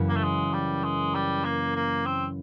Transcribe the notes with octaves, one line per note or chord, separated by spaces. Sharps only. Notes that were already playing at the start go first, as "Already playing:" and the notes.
Already playing: F#2 C#3 E3
A#3
A3
G#3
G3
G#3
G3
A#3
A#3
C4